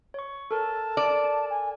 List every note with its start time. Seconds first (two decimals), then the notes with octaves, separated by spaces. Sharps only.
0.14 C#5 C#6
0.51 A4 A#4 A5
0.97 D5
1.50 G#5